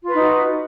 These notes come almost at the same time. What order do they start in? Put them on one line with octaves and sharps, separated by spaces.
F4 B4 D#4 F#4